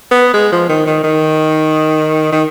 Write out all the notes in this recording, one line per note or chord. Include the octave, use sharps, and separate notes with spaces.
B3
G#3
F3
D#3
D#3
D#3
D#3